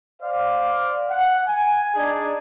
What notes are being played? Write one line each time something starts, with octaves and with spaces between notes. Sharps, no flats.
C5 D5 F5
F#5
G#5
D4 D#4 G#4 D5